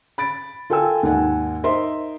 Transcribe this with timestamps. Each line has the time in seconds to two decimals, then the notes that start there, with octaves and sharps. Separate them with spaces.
0.18 B5 A6 D7
0.70 F4 A4 A#4 G5 G#5 E6
1.03 D#2 G#2 F#5 G#5
1.64 D#4 A#4 C5 D#5 E5 C6